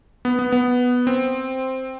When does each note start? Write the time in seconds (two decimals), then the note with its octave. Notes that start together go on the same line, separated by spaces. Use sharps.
0.25 B3
0.39 B3
0.52 B3
1.07 C4